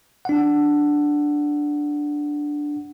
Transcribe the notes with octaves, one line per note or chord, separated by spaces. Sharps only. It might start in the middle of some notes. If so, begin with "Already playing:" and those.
D4 F#5